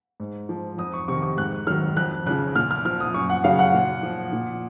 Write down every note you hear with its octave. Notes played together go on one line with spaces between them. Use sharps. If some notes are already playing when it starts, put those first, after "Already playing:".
G#2
F3
F2 D#6
C#6
C3 D#3 C#6
C#6
G#2 F#6
D#3 F#3 F6
F2 F#6
C#3 F3 F#6
A#2 F6
F6
F3 F6
D#6
F#2 C#6
F#5
C#3 F#3 F5
F#5
A#2
F3
A#2